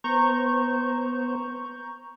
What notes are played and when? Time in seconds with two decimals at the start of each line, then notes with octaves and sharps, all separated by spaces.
0.04 B3 C5 A#5 C#6 G6